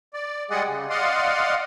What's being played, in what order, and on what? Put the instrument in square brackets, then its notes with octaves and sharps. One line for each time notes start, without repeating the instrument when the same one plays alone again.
[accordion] D5
G3 G#3 G#4 D5 D#5 F#5
C#3
D5 D#5 F5 F#5 C6